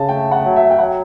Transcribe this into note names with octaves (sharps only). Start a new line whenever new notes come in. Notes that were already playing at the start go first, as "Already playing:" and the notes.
Already playing: C#3 A5
A3 G5
F#5
F#3
E5
G5
F#3 F#5